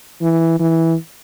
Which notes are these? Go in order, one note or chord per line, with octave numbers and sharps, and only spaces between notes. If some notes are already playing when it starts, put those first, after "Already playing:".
E3
E3